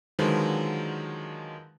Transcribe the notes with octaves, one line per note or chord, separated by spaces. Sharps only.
D3 D#3 F3 F#3 G#3 B4